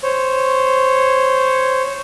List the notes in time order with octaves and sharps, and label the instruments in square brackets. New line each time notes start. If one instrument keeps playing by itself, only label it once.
[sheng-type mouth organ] C5 C#5